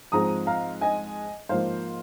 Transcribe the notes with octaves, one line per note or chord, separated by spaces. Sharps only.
G#2 F3 G#3 C4 A#5 D#6
F5 A#5
D#5 G#5
G#2 F3 A#3 C5 F5